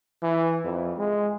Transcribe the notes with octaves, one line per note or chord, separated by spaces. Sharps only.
E3
F2
G#3